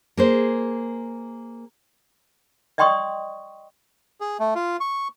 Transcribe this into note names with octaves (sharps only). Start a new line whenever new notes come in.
A#3 G#4 C5
D5 D#5 G5 C6 C#6 D#6
G#4
A3
F4
C#6